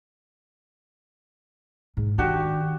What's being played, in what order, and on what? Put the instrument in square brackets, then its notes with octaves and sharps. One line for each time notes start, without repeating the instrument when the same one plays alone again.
[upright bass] G#2
[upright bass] D#3 [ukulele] D4 F#4 G4